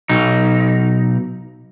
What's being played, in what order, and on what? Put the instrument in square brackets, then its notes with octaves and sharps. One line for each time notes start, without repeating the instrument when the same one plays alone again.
[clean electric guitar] B1 D#4